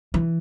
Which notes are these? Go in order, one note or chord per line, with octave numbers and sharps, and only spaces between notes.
E3